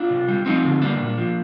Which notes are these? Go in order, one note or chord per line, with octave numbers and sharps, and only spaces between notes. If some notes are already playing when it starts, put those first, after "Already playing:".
Already playing: D4 F4
C3
G3
F3 C4 D#4
D3
G3 A#3 D4
A#2
F3